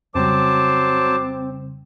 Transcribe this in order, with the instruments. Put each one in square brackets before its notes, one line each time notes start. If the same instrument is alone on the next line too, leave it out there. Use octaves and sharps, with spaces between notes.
[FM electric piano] F2 C#3 G3 [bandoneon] F#3 C5 A5 [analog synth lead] C4 [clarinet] D6